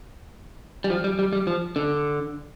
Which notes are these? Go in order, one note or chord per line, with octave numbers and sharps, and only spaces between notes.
G3
F3
G3
G3
G3
F3
D3